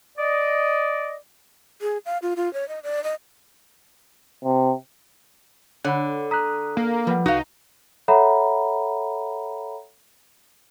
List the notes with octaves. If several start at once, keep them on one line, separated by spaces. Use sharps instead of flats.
D5 D#5
G#4
F5
F4
F4
C#5
D#5
D5
D#5
C3
D3 C#5 F#5 B5
A#5 D#6 F#6 B6
A#3
F3 G3 B4 F#5
C2 D#4 F#4 F5
A4 C#5 E5 F#5 A#5 B5